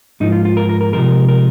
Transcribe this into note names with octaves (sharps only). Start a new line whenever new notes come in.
G#2 F3 A#3 D#4
F4
F4
A#4
A#4
A#4
C3 F3 G#3 A#4
A#4